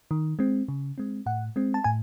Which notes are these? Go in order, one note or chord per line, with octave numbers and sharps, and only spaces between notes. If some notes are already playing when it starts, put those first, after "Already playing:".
D#3
G#3 C4
C#3
G#3 C4
A2 F#5
G#3 C4
A5
A2 G#5